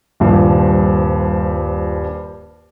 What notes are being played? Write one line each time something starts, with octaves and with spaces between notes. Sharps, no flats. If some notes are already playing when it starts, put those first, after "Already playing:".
D#1 G2 F3